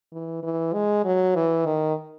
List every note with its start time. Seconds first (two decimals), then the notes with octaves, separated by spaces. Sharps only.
0.12 E3
0.43 E3
0.73 G#3
1.04 F#3
1.35 E3
1.66 D#3